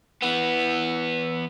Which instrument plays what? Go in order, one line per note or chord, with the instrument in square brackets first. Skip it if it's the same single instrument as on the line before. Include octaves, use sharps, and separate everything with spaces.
[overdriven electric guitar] E3 B3